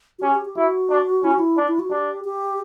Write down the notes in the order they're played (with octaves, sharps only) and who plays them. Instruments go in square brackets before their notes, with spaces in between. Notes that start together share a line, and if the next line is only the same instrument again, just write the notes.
[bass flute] F#4
[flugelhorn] C#4 [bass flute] G4
[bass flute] G4
G4
[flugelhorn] E4 [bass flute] F#4
[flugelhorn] D4
[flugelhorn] C#4 [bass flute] E4
[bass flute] F#4
E4
[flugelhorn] D4
[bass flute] E4
F#4
[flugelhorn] D4 [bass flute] G4
[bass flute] G4